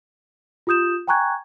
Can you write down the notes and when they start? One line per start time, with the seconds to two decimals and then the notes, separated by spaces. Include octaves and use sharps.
0.67 F4 G4 D#6 G6 E7
1.08 G5 G#5 A#5 C#6 F#6 G#6